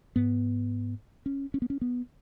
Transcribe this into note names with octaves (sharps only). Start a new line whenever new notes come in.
G#2 B3
C#4
C#4
B3
C#4
B3